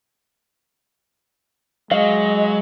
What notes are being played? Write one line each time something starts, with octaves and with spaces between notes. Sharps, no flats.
F#3 G#3 D#5 F5